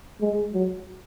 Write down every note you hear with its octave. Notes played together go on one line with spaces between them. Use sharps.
G#3
F#3